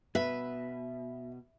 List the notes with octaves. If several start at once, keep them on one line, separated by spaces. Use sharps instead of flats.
B2 B4 E5